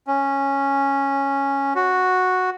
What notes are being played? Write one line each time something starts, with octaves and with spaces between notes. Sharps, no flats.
C#4
F#4